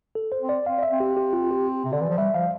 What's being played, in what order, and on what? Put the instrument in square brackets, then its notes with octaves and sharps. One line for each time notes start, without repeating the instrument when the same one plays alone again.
[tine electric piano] A4
C5
[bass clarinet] C4
[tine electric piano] D5
[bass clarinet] C4 [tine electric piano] F5
[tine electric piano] D5
E5
[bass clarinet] C4
[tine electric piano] G4
G4
F4
G4
[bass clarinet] C3
[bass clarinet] D3 [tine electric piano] D5
[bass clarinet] E3
F3
[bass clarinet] G3 [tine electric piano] E5
[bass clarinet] F3 [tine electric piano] F5